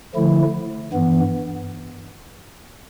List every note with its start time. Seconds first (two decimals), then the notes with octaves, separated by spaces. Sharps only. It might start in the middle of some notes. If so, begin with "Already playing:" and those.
0.15 D3 F3 A3 E4
0.92 G2 E3 B3